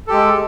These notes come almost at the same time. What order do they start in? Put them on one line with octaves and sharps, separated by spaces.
A4 G4 G#3